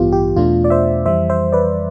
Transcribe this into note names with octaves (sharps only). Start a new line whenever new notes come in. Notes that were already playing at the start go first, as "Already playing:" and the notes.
Already playing: A1 G2 E3 B3 F4 G4
G4
E2 B2 A3 D4 F4
D5
C5 E5
F2 E3 G3 C5 E5
C5 E5
B4 D5